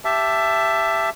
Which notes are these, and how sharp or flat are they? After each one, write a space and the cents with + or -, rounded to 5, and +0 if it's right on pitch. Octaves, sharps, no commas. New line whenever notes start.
G4 +0 E5 +15 A5 +0